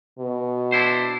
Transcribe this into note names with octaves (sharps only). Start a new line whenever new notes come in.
B2
D4 E4 C5